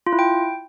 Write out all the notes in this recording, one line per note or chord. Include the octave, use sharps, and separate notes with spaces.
F4
E4
G5